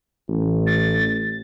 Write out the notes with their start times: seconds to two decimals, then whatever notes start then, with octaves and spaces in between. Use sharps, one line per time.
0.28 A1
0.67 A6